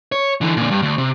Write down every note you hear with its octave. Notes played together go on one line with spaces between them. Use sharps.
C#5
D3 E3
A#2 D3
G2
D2
C3